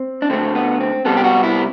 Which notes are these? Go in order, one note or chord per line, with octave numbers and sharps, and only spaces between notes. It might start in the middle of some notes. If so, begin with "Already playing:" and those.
Already playing: C4
D4
D3 A3 C4
B3
C4
C3 G3 B3 A4
G4
F#4
E4